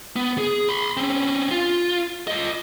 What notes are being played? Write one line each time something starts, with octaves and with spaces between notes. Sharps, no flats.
B3
G#4
B5 C6
C4 C#4
F4
F4 D#5